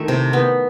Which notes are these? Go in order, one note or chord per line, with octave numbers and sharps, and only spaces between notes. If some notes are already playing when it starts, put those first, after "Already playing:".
Already playing: D#3 A3 E4
C3
B3